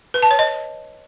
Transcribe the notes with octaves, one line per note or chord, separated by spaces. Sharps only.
B4
A5
C#5
D#5